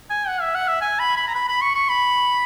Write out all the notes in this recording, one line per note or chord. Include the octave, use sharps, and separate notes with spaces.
G#5
F#5
E5
F#5
E5
G#5
B5
B5
A#5
B5
B5
C#6
C#6
B5